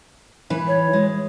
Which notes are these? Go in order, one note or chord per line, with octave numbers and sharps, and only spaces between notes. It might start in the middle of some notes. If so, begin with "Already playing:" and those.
E3 B4
C#5
G#3